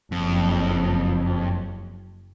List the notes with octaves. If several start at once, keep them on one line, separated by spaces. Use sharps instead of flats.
F#1 F2